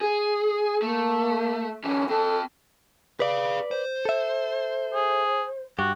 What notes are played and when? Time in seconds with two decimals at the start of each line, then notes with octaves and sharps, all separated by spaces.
0.01 G#4
0.82 A3 A#3
1.84 D3 E3 C#4
2.09 C4 A4 A5
3.20 G#4 B4 D5 F5
3.71 C5
4.05 A4 E5
4.95 G#4
5.79 G2 F#4 G4